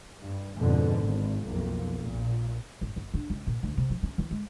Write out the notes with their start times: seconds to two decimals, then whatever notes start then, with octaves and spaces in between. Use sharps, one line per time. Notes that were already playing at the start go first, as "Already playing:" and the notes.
0.20 G2
0.58 F2 G#2 B2 D3
0.99 G#1
1.46 B1 F2 A#3
1.99 A#1 A#2
2.81 G#1
2.96 F#1
3.14 D4
3.30 C#2
3.47 A#2
3.63 D2
3.77 C3
3.90 F3
4.03 C#4
4.18 E3
4.31 G#3